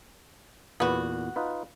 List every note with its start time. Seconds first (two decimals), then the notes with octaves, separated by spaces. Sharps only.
0.80 E2 A#2 B3 F#4
1.36 D#4 F4 B4